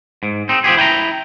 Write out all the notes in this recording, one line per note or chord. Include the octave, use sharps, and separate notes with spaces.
G#2
C4 D#4
F3 C4 G4 G#4
E4 G5 G#5 A#5